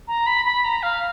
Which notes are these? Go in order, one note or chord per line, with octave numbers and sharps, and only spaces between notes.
A#5
B5
B5
A#5
F5